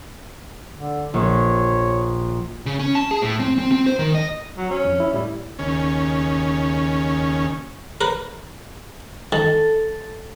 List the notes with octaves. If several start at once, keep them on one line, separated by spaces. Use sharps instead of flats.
D3
A#1 C#5
C#3
C#4
A5
G#4
A2
C4
C4
C4
C5
D#3
D#5
F#3
C#4
F2
E4
A2 G3 E4
D#2 C#3 C#4
A#4 B4
D#3 A4